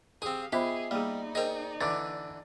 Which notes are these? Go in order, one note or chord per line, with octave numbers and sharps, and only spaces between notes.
C4 G4 G#4 F5 D#6
B3 F4 G4 G#4 C5 D#5 E5 B5
G3 A#3 D#4 G#4 D5
G#4 A#4 C5 D#5 G5
D3 E3 D6 A6